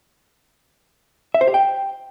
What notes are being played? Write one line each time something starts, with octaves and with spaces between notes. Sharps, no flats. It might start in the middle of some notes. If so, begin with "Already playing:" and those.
E5
C5
G4
G5